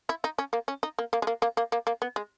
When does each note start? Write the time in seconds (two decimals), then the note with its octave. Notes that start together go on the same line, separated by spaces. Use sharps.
0.09 E4
0.24 D#4
0.38 C#4
0.53 A#3
0.68 C#4
0.83 D#4
0.98 A#3
1.13 A#3
1.22 G#3
1.27 A#3
1.42 A#3
1.57 A#3
1.72 A#3
1.87 A#3
2.02 B3
2.16 G#3